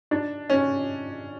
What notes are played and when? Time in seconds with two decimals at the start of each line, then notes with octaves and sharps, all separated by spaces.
0.11 D4
0.50 C#4